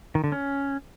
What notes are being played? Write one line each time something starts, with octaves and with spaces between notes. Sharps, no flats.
D#3
D3
C#4